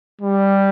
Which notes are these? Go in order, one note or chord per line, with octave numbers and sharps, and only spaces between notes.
G3